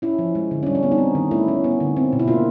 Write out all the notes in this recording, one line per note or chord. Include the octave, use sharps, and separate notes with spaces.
C#4 E4
F3
G#3
D3
C#4
G3 D4
C#4
B3 D4
D#4
C4
D#3
A3 E4
C#4
B3
D3
C4
B2
E4
A#3 F4